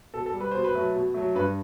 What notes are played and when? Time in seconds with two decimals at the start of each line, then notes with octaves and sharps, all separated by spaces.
0.14 B2 A4
0.26 A4
0.33 G3
0.41 B4
0.51 B2 C5
0.64 B4
0.74 F#3 A3
0.95 B2
1.14 F#3 A3
1.35 G2 B4